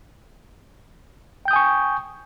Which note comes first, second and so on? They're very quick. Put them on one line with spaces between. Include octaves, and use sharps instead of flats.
G5 G6 D#6 G#5 C#6